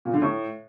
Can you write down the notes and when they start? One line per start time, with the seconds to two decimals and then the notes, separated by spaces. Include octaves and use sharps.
0.05 A#2
0.14 D3
0.22 A2